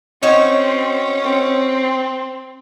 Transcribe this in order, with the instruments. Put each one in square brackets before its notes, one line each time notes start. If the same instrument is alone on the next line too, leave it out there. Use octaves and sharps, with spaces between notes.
[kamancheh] C4 [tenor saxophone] C#4 [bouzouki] D#4 F#4 C#5
[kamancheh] C4